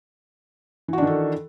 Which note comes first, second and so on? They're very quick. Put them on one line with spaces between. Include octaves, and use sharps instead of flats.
E3 F#4 D4 D#3 A4